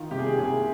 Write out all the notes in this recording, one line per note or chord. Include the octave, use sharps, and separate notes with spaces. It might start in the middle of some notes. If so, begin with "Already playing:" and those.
Already playing: D#3 F4
C3 G4
G#4
G4
C2 G#4